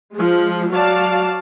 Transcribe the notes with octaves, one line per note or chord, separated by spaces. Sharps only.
F3 G#3
F#3 F#4 D5 F5 A5